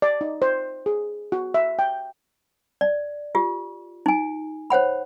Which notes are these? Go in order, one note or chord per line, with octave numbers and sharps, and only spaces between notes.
D5
D#4
C5
G#4
F#4
E5
G5
D5
F4 G4
D#4 G#5
C5 C#5 F#5 B5